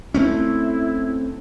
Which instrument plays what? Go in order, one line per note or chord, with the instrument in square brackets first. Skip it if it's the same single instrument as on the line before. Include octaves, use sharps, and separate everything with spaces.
[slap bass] A3 C4 C#4 [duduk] E4